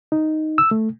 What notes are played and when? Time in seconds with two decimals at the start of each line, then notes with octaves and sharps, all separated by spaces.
0.12 D#4
0.58 E6
0.71 A3